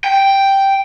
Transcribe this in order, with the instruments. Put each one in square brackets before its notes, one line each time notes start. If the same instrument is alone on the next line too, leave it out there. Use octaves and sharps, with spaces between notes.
[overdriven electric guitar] G5